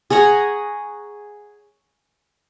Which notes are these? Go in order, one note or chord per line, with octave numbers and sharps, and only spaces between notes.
G#4 C#5 F#5 A#5